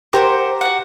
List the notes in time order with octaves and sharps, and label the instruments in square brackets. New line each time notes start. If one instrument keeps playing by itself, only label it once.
[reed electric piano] G4 A#5 D6 [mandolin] A#4 C5 F#5
[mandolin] F#4 F#5